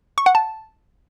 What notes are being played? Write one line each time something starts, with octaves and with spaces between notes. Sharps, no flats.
C#6
F#5
A5